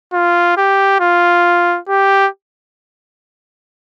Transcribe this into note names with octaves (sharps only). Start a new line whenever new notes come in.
F4
G4
F4
G4